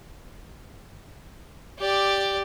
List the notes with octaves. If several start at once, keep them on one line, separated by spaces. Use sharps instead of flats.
G4 D5